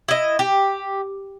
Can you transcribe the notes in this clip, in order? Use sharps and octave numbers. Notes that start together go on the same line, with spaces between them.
E4 D#5
G4